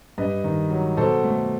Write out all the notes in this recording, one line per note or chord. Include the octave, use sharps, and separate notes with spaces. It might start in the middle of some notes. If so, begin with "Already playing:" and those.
G2 B4 D#5
D#3
F#3
B2 A4 C5
A3